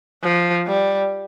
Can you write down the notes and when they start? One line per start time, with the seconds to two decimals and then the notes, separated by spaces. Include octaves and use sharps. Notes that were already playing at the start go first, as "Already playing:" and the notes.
0.23 F3
0.67 G3